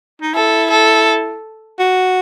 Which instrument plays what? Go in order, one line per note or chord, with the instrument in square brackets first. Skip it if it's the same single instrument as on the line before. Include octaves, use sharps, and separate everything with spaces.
[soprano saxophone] D#4
[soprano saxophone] E4 [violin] A4
[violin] A4
[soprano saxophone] F#4